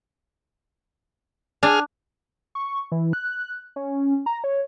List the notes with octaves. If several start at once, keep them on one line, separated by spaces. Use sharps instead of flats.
D4 G#4 F6
C#6
E3
F#6
C#4
A#5
C#5